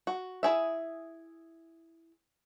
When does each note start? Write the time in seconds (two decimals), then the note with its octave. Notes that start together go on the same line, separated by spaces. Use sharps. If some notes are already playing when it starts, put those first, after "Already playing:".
0.07 F#4
0.43 E4 G#4 E5